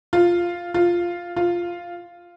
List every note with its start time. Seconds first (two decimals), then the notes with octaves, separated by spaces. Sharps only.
0.13 F4
0.74 F4
1.36 F4